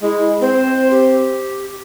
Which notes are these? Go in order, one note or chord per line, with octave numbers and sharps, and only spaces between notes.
G#3 E4
C4 C5
G4